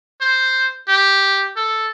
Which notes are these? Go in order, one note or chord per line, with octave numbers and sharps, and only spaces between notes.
C5
G4
A4